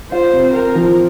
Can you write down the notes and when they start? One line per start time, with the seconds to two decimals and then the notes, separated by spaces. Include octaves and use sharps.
0.12 F4 C5
0.33 C3
0.54 C4 A#4
0.75 F3